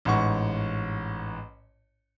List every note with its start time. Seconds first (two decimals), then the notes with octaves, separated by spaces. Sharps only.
0.05 A1 G#2 F#5 C#6